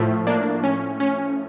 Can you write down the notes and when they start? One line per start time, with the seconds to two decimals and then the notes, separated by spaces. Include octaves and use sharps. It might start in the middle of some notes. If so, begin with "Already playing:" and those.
Already playing: A2 F3 A3
0.27 A#3 D4
0.64 C#4
1.00 C#4